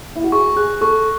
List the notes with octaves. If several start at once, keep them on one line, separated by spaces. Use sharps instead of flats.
E4
F#4
G#4 C#6
G#4 F#6
A4 C#6